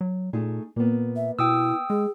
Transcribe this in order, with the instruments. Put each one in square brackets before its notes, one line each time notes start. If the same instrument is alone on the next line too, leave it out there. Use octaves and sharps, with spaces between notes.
[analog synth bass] F#3
[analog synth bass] A#2 [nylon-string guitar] A3 D#4 G#4
[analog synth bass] A#2 [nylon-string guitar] A#3 B3
[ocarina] E5
[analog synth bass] B2 [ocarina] E4 [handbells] G5 D#6 E6
[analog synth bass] G#3 [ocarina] G#4